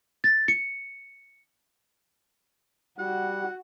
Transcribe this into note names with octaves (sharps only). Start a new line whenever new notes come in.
A6
C#7
G3 F#4 F#5